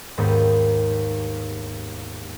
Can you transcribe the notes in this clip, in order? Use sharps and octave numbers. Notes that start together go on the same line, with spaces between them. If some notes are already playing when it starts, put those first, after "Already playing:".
D#2 G#2 B3 G4 D#6